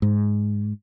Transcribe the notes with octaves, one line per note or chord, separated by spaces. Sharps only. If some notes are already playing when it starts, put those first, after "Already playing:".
G#2